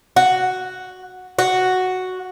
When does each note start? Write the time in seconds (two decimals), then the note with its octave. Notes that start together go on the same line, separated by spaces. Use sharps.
0.16 F#4
1.39 F#4